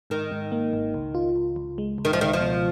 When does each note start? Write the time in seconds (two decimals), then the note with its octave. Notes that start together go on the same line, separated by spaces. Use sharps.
0.10 G#2 D#3
0.31 G#2
0.52 A#3
0.73 G#1
0.94 C#2
1.15 F4
1.36 C#2
1.56 C#2
1.78 G#3
1.98 C#2
2.05 D#3
2.13 F3
2.19 C#2 D#3
2.33 F3
2.40 B2